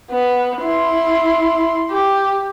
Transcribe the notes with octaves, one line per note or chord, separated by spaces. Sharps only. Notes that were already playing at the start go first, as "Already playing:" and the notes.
B3
E4 C6
G4